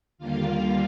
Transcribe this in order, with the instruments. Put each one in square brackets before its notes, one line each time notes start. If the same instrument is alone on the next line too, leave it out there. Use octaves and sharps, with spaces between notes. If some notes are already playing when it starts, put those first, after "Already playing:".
[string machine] D#2 D3 G3 A#3 F4 F5